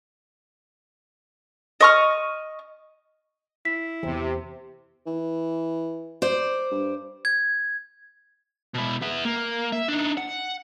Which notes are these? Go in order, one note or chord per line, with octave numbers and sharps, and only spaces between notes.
D#5 C#6 F6
E4 B6
E2 C3
E3
C5 D5
G2
G#6
B2 E4
B3 E5
A#3
E5
D4 D#4
F#5